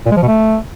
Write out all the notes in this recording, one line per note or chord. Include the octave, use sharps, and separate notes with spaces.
A#2
G#3
F3
B2
A3